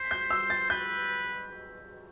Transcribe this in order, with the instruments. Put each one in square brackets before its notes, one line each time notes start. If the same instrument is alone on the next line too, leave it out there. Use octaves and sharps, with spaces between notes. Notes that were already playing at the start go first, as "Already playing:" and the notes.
Already playing: [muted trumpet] C5 [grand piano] B6
[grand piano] G6
E6
A6
[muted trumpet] B4 [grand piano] G6